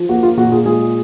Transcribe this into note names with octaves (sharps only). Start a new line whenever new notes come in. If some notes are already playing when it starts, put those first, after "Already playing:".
Already playing: F3
A#3 F#4
F4
A#2 F#4
F4 G#4
G#3 F4 G#4